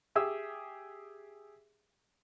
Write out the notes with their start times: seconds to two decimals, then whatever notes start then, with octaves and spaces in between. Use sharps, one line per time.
0.15 G4 G#4 E5 E6